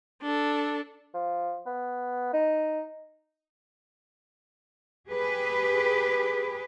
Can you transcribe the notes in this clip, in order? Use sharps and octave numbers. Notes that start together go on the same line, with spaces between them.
D4 A4
F3
B3
D#4
G4 G#4 B4